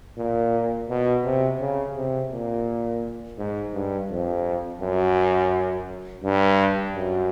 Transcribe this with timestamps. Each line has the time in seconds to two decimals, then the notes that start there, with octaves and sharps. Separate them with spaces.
0.18 A#2
0.90 B2
1.24 C3
1.60 C#3
1.96 C3
2.32 A#2
3.38 G#2
3.74 G2
4.10 F2
4.82 F#2
6.24 G2
6.96 F#2